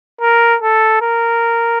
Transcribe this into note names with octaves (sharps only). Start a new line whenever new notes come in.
A#4
A4
A#4